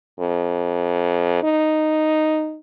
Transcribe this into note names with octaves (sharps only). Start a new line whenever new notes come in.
F2
D#4